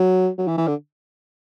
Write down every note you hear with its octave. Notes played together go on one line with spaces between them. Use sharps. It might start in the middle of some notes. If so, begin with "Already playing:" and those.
Already playing: F#3
F#3
E3
E3
D3